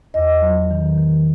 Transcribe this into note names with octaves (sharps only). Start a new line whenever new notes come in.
E2 D#5
F#3
D#3
D#3